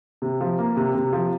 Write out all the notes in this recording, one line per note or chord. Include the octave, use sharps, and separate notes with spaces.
C3
F3
A#3
C3
C3
F3